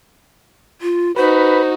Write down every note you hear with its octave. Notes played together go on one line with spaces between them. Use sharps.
F4
D#4 F#4 B4 C5